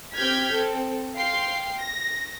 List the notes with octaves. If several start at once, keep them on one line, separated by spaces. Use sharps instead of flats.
C4 G4 F6 G6 G#6 B6
C4 A4
F5 G5 C6 C7
A#6